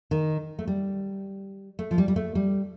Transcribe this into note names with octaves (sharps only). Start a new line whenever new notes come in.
D#3
A3
G3
A3
F3
G3
G3
A3
G3